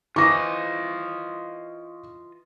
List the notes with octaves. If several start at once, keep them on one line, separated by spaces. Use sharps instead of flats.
E3 F4 C5 D#5 A#5 C#6 D6 A#6